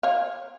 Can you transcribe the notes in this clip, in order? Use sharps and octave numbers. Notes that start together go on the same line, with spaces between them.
C#5 F5